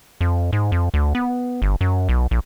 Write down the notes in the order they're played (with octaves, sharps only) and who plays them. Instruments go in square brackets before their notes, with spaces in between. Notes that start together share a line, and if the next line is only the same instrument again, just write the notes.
[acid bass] F2
G#2
F2
D2
B3
G1
F#2
B1
A#1